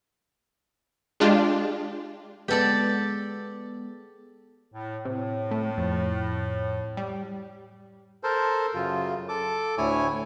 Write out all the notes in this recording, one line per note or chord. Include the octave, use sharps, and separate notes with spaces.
G#3 D4 F4 G4
G#3 B3 G4 A4 D5
A2
A2 C3
A3
F2
G3
A4 A#4 C5
F#2 C#3 F4
A4 D6
D2 A2 E4 C#5 G#5